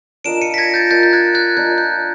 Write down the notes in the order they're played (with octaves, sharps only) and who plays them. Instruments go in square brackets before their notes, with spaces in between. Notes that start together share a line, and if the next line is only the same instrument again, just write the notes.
[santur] D4 F4 A#4 D#5 [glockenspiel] D7 E7
[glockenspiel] C#7 D#7
B6
G#6 A#6
G6 A6
[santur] D4 F4 A#4 D#5 [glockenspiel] G6 A6
[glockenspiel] G6
F#6 G#6
F#6 G#6
[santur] D4 F4 A#4 D#5 [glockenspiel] G6
[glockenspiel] G6